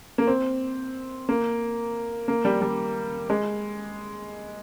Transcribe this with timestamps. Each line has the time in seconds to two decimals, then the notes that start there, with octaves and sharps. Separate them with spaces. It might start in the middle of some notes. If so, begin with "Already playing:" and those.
0.18 A#3
0.27 C4
1.29 A#3
2.28 A#3
2.45 G3
2.61 G3
3.30 G#3